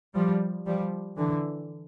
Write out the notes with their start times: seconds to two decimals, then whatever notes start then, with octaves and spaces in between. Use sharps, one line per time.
0.15 F3 G3
0.65 F3 G3
1.17 D3 E3